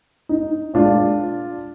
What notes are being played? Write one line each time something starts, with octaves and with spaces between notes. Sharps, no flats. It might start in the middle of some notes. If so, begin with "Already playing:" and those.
D#4
A#2 G#3 D4 F4